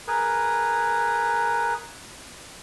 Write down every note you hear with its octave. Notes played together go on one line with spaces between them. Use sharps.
G#4 A#4 B4